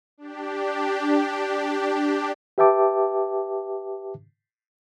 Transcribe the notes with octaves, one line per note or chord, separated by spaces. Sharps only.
D4 G4
G4 B4 E5 G5 A5 D6